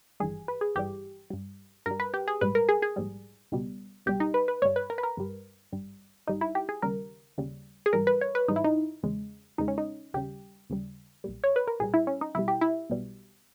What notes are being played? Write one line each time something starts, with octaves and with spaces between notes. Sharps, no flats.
G#1 G2 E3 G3 G#4
B4
G#4
G#1 G2 E3 G3 G4
G2 G3
G2 G3 A#4
B4
G4
G#4
A#1 G#2 G3 B4
A#4
G#4
G#4
A#1 G#2 G3
C#2 B2 G3
C#2 B2 G3 G4
D#4
B4
B4
G1 G2 G3 C#5
B4
A#4
B4
A#4
G1 G2 G3
G#1 G2 G3
G#1 G2 G3 D#4
E4
G4
G#4
D#2 C#3 G3 A#4
D#2 C#3 G3
G#4
G#1 G#2 E3 G3 A#4
B4
C#5
B4
G#1 G#2 E3 G3 D#4
E4
D#4
E2 C#3 G#3
E2 C#3 G#3 D#4
C#4
D#4
D#2 C#3 G3 G4
D#2 C#3 G3
B1 A#2 G3
C#5
B4
A#4
B1 A#2 G3 G#4
E4
C#4
D#4
B1 B2 G3 E4
G4
E4
B1 B2 G3